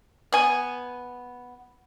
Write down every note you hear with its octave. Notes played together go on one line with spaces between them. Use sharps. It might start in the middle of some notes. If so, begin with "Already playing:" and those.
B3 G#5